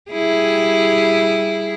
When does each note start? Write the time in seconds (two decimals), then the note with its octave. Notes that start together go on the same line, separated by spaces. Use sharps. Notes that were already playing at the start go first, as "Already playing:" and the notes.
0.11 G3 E4 G#4